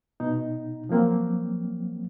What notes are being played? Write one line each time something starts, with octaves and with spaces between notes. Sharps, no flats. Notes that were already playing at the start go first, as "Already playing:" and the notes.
B2 D#4
F3 F#3 A#3 C4